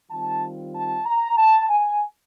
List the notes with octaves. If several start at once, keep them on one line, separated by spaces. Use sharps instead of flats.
D#3 G3 C4 F4 A5
A5
A#5
A5
G#5